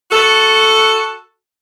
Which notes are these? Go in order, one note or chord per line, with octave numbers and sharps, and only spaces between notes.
F#4 A4